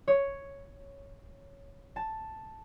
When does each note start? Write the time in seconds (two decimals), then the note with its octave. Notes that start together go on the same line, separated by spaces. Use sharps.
0.08 C#5
1.96 A5